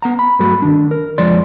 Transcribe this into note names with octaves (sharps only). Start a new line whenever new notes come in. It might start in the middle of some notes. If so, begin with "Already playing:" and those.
B3 F#5 A#5
B5
G2 F#3 A3 F#4 B5
D#3 D4
A#4
F2 F3 G#3 D5 C6